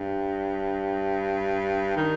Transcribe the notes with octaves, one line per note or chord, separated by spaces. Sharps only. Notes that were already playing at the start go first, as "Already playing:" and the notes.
Already playing: G2
D#3